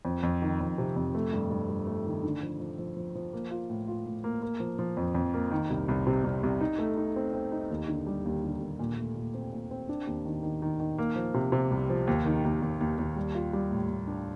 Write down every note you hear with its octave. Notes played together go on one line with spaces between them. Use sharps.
F2
F2
D#3
F2
C3
F2
A3
G2
G2
G2
A3
D#3
D3
F3
F3
F3
F3
F3
A#3
F4
A2
F4
A2
A#3
A#3
F3
F3
F2
F2
A#3
D#3
C2
C2
C3
C2
C2
D#4
A3
D#4
C4
C4
D#4
D#2
D3
G3
D#2
D3
D#2
A#2
A3
A#2
C4
A#2
C4
D4
D#2
D#3
D#3
D#3
D#3
A#3
F3
C3
C3
C2
F3
D#2
D#3
D#2
D#2
D#2
D#2
G3
F4
G3
A2
A2
D4